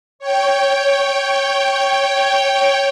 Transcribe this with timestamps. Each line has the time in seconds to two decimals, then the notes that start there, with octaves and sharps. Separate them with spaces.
0.19 C#5 G5